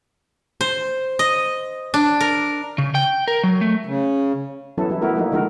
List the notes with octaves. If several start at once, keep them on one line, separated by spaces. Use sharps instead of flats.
C5
D#5
D4
A#4
C#3
G5
A#4
F#3
A3
C#3
E3 F#3 B3 C#4 E4 A4
F#3 G3 E4
A3 B3 E4 F#4 A#4
F3 F#3 A3 A#3 D#4 E4
D3 D#3 F3 G#3 F#4 A#4